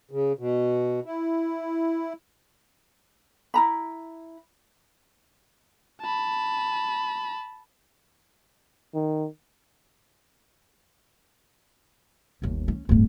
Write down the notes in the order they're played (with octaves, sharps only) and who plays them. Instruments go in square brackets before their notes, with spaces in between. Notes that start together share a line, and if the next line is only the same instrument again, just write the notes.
[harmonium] C#3
B2
E4
[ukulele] E4 A#5 B5
[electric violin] A5 B5
[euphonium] D#3
[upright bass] G1 D#2
C#4
D1 G2